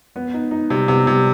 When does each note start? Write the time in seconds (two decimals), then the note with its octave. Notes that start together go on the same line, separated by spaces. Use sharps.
0.16 B3
0.34 D#4
0.51 D#4
0.70 C3 G3
0.88 C3 B3
1.07 C3 G3